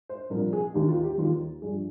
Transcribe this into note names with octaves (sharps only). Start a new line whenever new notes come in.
C5
C2 A#2 F3 A#4
G#4
D#2 D#3 G4
F4
G4
D#2 D#3 F4
G2 F3 G#4